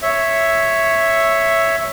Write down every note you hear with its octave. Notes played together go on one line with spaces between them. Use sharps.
C#5 E5